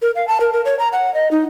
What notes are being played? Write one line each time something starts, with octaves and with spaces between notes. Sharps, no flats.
A#4
F5
A5
A#4
A#4
C#5
A#5
F#5
D#5
D#4